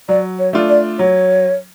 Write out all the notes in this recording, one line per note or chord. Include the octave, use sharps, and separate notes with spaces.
F#3 D5
C#5
A3 D4 F4
D5
F#3 C#5